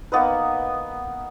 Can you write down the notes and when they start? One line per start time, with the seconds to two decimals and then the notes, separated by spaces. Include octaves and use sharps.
0.12 A#3 B3 D#4 B4